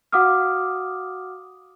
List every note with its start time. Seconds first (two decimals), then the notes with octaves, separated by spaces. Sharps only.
0.12 F#4 F5 F#5 D6 D#6 F6